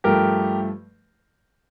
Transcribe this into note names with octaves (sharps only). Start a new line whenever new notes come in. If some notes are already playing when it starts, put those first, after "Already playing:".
G2 F3 A3 G4 A#4